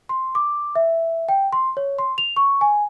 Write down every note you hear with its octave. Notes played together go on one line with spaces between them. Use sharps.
C6
D6
E5
G5
C6
C#5
C6
F7
C#6
G#5